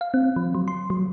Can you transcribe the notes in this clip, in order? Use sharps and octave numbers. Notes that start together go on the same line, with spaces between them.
F5
C4
F3
F#3
C6
F#3